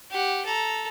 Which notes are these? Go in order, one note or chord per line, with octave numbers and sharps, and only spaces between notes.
G4 F#5
A4 A#5